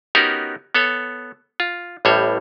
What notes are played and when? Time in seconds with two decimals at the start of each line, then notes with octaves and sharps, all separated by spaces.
0.15 B3 C#4 D#4 F#4 G4 A#4
0.75 B3 A4 C#5
1.60 F4
2.05 A1 A2 G3 C5 C#5